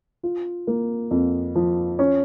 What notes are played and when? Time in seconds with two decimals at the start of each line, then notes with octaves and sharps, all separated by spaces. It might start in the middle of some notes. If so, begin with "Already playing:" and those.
0.23 F4
0.67 A#3
1.11 F2
1.56 F3
1.99 C#4